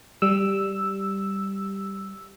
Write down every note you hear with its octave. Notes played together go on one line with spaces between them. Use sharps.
G3 E6